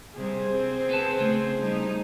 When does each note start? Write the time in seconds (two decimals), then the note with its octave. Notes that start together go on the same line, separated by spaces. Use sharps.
0.17 C3 G3 G#4 C5
0.49 C4
0.89 B3 B4 A5
1.19 C#3 A3
1.58 G3 D#4